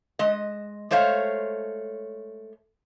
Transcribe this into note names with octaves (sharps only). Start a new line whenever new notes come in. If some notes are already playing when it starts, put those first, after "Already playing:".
G#3 D#5
G#3 A3 C5 C#5 F5